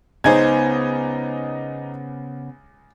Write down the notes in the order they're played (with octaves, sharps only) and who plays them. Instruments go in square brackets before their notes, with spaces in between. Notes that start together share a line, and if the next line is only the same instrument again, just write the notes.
[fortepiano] C#2 [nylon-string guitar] C#3 B3 C5 [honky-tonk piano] D#4 G#6